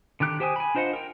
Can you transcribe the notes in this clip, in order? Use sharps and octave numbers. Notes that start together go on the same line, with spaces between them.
D3 D#3 G4 F#6
G4 C5 G5 G#5 D#6
G#5 B5
D4 F4 C5 D#5 F#5
A#4 G5